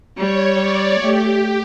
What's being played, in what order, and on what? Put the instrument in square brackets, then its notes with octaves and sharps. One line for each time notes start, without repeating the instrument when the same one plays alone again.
[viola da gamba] G3 [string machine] C#5
[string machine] D5
[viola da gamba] A3 [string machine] G4